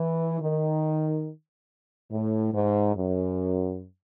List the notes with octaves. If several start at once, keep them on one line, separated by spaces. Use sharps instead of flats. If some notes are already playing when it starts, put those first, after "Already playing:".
Already playing: E3
D#3
A2
G#2
F#2